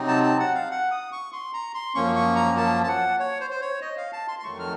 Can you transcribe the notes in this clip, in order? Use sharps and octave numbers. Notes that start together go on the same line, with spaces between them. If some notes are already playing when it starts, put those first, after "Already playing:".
Already playing: C3 F#3 C4 D#4
A5
A5
F#5
F5
F#5
D#6
C#6
C6
A#5
C6
F#2 F3 A#3 C#4 C#6
C#6
A#5
A5
A5
F#5
C#5
C5
C5
C#5
D#5
F5
A5
C6
C6
F2 D#3 F#3 A3 C#6
F6